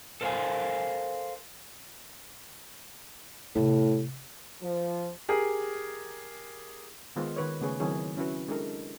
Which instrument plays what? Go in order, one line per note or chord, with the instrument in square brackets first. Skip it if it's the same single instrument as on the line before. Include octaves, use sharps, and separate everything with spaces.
[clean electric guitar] A4 A#4 C5 E5 F5 G#5
[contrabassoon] A2 [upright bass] C3 C4
[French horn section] F3
[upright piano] G4 G#4 A#4
[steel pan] D#3 G#3 B3 F4 C5
D#3 B4 C#5
C#3 A3 B3 G#4 B4 C#5
D#3 F#3 C4 E4 G#4 C#5
C#4 E4 F#4 B4
G#3 D4 E4 A4 A#4